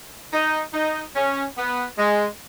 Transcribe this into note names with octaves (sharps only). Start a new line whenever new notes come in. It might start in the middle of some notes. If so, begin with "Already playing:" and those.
D#4
D#4
C#4
B3
G#3